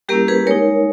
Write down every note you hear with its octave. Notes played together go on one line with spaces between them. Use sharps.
G3 A#3 C#4 E4 G4 A#4
G#4 B4
G#3 D#4 A#4 C#5